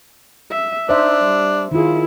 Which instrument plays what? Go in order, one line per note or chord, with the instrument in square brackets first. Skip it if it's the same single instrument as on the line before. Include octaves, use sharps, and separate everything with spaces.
[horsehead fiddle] E5
[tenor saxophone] D4 [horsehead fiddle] D#4 [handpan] C5 E5
[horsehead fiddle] G3
[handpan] D#3 F4 [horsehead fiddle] E4 G#4